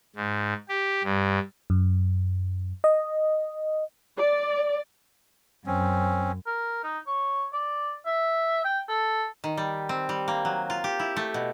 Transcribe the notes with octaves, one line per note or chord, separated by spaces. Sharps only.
G#2
G4
G2
F#2
D#5
D5
F#2 C4 C#4
A#4
D#4
C#5
D5
E5
G5
A4
D#3
G3
C4
G3
A#3
F#3
F4
G4
E4
A3
B2